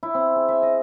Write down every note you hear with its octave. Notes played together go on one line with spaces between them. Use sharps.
E4
C4
G#4
E5
D#5